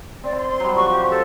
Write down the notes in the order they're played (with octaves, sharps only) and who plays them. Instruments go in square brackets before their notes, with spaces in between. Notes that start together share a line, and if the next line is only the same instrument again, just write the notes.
[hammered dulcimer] C4 [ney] D5
[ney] C6
[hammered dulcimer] F#3 G3
[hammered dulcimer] F3 [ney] C#6
[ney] G4
A4